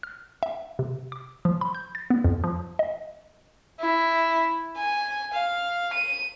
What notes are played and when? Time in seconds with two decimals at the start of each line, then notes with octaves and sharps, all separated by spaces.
0.03 F6
0.43 E5
0.79 C3
1.12 D6
1.45 F3
1.61 B5
1.75 G6
1.95 A6
2.10 B3
2.24 F2
2.44 F3
2.79 D#5
3.80 E4
4.77 G#5
5.33 F5
5.93 D#7